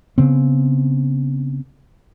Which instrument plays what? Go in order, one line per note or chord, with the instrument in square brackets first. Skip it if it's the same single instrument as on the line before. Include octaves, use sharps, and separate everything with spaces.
[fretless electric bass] C#3 B3 C4